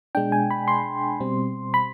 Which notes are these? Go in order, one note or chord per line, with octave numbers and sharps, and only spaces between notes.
B2 G#3 D4 G5
G#5
B5
C6
B2 G3 C4
B5